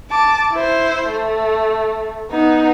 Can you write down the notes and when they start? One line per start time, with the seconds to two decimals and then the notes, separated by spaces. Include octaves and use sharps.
0.10 A5 D6
0.52 E4 C5
1.09 A3
2.31 B3 D#4